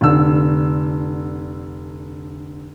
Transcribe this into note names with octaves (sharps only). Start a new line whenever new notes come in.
F1 D3 E6